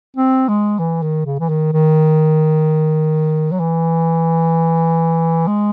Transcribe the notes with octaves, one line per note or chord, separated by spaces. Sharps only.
C4
G#3
E3
D#3
C#3
E3
D#3
D#3
F#3
E3
G#3